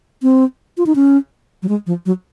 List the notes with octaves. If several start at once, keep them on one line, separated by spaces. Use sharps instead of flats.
C4
F4
D#4
C#4
F#3
G#3
F3
F#3